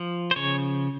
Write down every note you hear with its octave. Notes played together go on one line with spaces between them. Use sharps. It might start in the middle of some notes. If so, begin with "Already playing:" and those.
Already playing: F3
C5
C#3 C#5